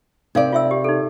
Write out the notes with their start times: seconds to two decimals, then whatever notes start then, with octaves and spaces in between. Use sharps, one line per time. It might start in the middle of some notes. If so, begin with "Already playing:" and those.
0.35 C3 D#4 A#4 D5 F5
0.53 F4 E5 E6
0.71 G4
0.84 D#4 A4